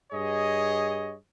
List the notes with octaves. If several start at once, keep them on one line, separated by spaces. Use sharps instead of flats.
G2 G#4 C#5 D#5